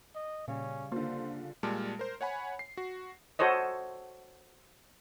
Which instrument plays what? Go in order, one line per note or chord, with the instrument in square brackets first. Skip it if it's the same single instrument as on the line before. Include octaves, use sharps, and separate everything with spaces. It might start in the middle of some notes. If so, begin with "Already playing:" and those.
[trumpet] D#5
[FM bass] A#2 [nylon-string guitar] C#3 G3 [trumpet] C#4
[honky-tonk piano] D3 F4 [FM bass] A#3 [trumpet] C5
[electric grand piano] A#2 G3 G#3 A5 F6
A#4 C5
C#5 F#5 G#5 B5
C7
F#4
[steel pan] F#4 A4 C5 C#5 D#5